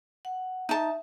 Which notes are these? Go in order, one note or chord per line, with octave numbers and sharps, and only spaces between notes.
F#5
D#4 E5 A5